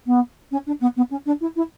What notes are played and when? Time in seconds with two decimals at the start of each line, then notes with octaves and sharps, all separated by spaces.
0.06 B3
0.52 C#4
0.67 D4
0.81 B3
0.97 B3
1.11 C#4
1.26 D4
1.41 E4
1.56 E4